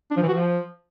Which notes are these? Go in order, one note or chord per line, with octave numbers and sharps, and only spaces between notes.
D4
F3
E3
F#4
F3